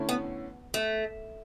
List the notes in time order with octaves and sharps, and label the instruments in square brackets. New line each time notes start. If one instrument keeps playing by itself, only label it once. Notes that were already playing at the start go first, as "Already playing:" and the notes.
Already playing: [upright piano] D3 A3 C#4 E4
[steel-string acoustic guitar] B3
A3